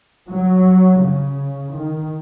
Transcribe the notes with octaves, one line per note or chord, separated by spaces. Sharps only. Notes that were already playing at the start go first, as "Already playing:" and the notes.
F#3
C#3
D#3